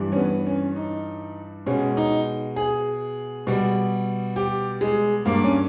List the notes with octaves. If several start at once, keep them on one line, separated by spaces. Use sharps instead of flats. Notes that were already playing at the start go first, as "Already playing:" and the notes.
Already playing: G2 E3 G3
C#4
B3
C#4
D#4
B2 G#3 C#4
D#4
G#4
B2 G3
G4
G#3
G2 G3 A#3
C#4